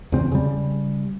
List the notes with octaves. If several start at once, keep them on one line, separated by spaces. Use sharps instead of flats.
E2 C#3 C4
C#3 G3